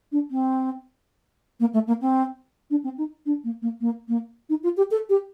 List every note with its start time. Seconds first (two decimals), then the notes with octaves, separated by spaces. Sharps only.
0.12 D4
0.31 C4
1.60 A#3
1.74 A3
1.87 A#3
2.01 C4
2.70 D4
2.84 C4
2.98 D#4
3.26 D4
3.44 A#3
3.62 A#3
3.81 A#3
4.08 A#3
4.49 D#4
4.63 F4
4.77 G4
4.91 A4
5.09 G4